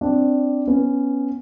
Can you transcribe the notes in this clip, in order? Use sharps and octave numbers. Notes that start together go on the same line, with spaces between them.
C4 D4
B3 C#4